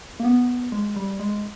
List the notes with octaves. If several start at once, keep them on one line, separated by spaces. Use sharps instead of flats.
A#3
B3
G#3
G3
G#3